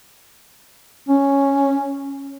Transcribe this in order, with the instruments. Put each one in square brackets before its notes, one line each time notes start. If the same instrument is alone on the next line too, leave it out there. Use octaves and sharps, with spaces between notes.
[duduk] C#4